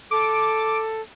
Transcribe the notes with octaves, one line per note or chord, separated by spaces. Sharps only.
A4 D6